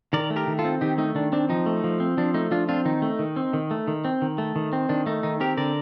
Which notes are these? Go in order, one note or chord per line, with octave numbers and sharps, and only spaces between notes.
D#3 A#4 D5
A3
G4 A#4
D#3
F4 A4
C4
D#3 D#4 G4
A3 D#4
D#3 D4
C4 D4
F3 D#4
A3
F3
C4
F3 D4
A3 D#4
F3 D4 F4
C4 D4 F4
D#3 D#4
A3
D#3
C4
D#3
A3
D#3
C4
D#3
A3
D#3
C4
D#3 D4
A3 D#4
D#3 D#4
C4 G4 A#4
D3 A#4 D5